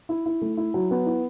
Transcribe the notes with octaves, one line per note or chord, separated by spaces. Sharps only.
E4
E4
A3
E4
F#3
B3
E4